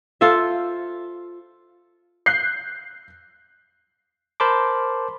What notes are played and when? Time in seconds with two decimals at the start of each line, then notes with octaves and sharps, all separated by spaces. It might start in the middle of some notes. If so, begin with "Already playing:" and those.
0.21 F4 A4 C5 E5
2.26 F#6 G6 C7
4.40 A#4 C5 A5 B5 C6 D6